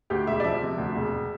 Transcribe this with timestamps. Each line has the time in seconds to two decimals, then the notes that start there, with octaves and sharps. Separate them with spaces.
0.10 D2 G4
0.27 E1 E5
0.40 D5
0.44 F3 E5
0.61 C3
0.78 D2
0.95 E1